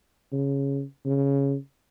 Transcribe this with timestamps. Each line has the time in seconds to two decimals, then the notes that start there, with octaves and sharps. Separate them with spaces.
0.32 C#3
1.05 C#3